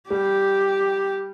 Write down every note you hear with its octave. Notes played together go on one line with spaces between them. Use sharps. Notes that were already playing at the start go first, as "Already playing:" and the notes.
G3 G4